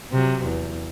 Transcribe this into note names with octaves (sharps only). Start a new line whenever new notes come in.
C3 F#3
E2